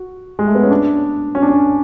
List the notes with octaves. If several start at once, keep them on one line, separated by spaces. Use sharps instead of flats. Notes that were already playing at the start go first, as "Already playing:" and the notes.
Already playing: F#4
G#3
A3
B3
C#4
D4
C#4
D4
C#4